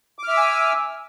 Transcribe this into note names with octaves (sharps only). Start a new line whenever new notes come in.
E5 G#5 D6 E6 F6